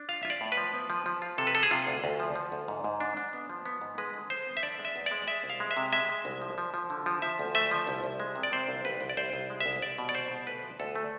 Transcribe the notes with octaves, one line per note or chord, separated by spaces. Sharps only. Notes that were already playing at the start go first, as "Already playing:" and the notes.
Already playing: D4
F4 F5
F4 E5
D5
A2
B4
F3
B3
F3
F3
F4
C3 A4
B4
F3 A4
G#4
C3 F4
D2
D2
F3
F3
D2
G#2
G#2
D4
D4
B3
F3
B3
G#2
G#3 B4
D3
D3 C5
B3
E5
D3 D5
G#3
E5
E2
D5
G#3
G#3 E5
C2
F5
G#3
E5
C3
G#3 E5
G#3
C2
F3
F3
F3
D3
F3
F3 E5
D2
A3 E5
F3
C2
C2
G#3
C3
D5
C3 C5
C2
C2 B4
C2
D5
C2 C5
C2
G#3
E5
C2
C2 D5
B2
D5
C2 C5
B2
D2 B4
F3
D2 A4
A3